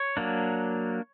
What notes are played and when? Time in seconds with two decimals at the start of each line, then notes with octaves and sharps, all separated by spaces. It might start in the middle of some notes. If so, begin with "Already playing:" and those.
Already playing: C#5
0.17 F#3 A#3 D4